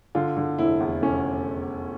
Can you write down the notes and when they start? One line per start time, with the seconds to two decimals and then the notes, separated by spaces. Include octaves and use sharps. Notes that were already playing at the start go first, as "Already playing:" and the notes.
0.15 D3 F4
0.37 D3
0.58 F1 E4
0.80 E2
1.02 F1 C#4